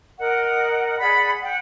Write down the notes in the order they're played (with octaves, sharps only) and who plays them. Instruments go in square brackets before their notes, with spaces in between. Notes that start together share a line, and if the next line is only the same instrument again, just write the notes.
[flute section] A#4 D#5 F#5
G#4 D5 F#5 B5
F#5 G5